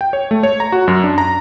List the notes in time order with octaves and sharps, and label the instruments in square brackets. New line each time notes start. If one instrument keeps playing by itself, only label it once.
[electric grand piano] G5
C#5
A3
C#5
A#5
F#4
F#2
D4
A#5